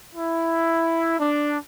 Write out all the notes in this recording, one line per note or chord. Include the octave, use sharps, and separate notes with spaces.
E4
D4